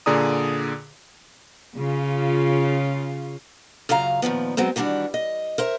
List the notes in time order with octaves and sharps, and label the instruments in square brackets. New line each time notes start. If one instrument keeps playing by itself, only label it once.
[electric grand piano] A#2 D3 G#4 D5 A#5 D#6
[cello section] C#3 F4
[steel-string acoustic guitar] F#2 C#3 F4 F5 A#5
A#2 D#3 F3 B3
F#3 G#3 B3 C4
D#3 E3 G3 D4 F#4
D#5
A#4 C5 E5